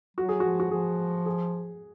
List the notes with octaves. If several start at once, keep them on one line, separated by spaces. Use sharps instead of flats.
F#3 F#4
G#4
F3 F#4
F#4
F3 G#4
G#4